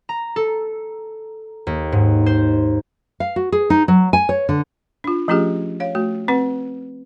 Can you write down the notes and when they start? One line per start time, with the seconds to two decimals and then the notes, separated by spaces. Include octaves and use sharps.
0.09 A#5
0.36 A4
1.67 D#2
1.92 G#2
2.26 C5
3.20 F5
3.36 F#4
3.52 G#4
3.70 D#4
3.88 F#3
4.13 G#5
4.29 C#5
4.49 D3
5.04 D4 F4
5.28 F3 A3 C#4 F4 G4 G#4
5.80 C#5 F5
5.95 A3 F#4
6.28 C4 B4 F#5